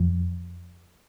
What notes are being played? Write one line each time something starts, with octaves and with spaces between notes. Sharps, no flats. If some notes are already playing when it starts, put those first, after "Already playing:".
Already playing: F2 F3